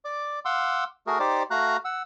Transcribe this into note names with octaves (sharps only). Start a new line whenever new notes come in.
D5 D6
F5 F#5 C6 D6 E6
A3 F#4 G#4 A#4
D#4 G4 C5 D5 D6
A3 F#4 F5 A#5 F#6
F#5 E6